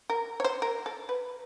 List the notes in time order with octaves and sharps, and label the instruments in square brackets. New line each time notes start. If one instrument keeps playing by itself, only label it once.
[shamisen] A#4
C#5
C5
A#4
A4
B4